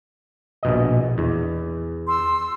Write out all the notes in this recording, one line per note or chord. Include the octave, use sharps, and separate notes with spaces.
A#1 B2 D#5
E2
C6 E6